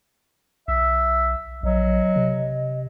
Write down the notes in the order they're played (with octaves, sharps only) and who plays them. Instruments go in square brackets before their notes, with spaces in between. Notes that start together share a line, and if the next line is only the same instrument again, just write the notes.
[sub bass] B1 [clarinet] E5
[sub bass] A#1 [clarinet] F#3 [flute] D#5
[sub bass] C3